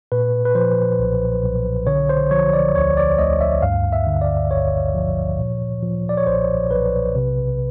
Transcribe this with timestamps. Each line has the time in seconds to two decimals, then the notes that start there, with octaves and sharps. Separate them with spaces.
0.12 A#2 B4
0.45 B4
0.55 F3 C5
0.99 B1
1.43 B1
1.87 D3 C#5
2.09 C5
2.31 F3 C#5
2.53 D5
2.75 D2 C#5
2.97 D5
3.18 D2 D#5
3.41 E5
3.62 G2 F5
3.93 E5
4.07 D3
4.21 D5
4.51 G#1 C#5
4.94 F3
5.39 A#2
5.83 F3
6.09 D5
6.17 C#5
6.27 B1 C5
6.70 B1 B4
7.15 C3